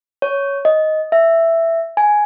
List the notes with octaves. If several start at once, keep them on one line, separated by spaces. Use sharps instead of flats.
C#5
D#5
E5
G#5